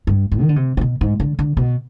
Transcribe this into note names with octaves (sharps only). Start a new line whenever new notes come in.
G2
G#2
D#3
D3
C3
C3
B2
G#2
D3
D3
B2